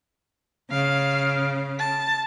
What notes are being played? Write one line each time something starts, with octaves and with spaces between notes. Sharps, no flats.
C#3 F5
A5